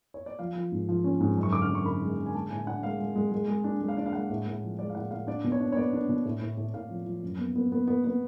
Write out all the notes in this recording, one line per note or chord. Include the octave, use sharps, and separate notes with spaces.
C#5
D5
F3 F5
F3
G#2
F3
C#4
G#2
F#2
C#6
D3 D6
F6
F#2
C#6
D3 B5
G#3
D3
G#5
G#3 A5
A2 G#5
D4 F#5
G#3 F5
G#3
G#3
G#3
G#3
D4
G#3
F5
D4 D5
F5
G#3 F#5
A2
A2
F3
G#3 D5
F5
A2 F#5
A2 F5
D4 D5
B2
C#5
D4
C#5
B3 D5
D4
B2
A2
A2
A2
A2 F5
F3
F3
F#2
B3
B3
B3
B3
B3